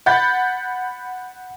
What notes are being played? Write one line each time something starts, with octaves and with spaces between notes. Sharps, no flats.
F#5 B5 G6 A6